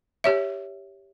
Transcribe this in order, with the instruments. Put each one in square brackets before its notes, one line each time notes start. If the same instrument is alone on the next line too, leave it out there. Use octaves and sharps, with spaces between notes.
[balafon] G4 C#5 E5